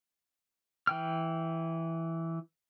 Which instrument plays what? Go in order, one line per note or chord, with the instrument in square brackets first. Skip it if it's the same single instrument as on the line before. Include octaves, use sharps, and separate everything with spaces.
[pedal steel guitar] E3 G5 F6